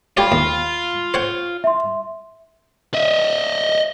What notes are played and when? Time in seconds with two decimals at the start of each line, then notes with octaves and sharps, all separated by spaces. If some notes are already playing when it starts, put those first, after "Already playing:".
0.17 F4 G4 C#5 D5 F5 B5
0.32 D#2
1.14 C5 C#5 F#5
1.64 E5 C6
2.94 D#5 E5